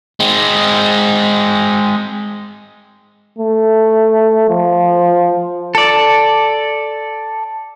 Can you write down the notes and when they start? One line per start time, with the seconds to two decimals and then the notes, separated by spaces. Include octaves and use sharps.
0.20 G#3 C4
3.38 A3
4.49 F3
5.75 A4 D5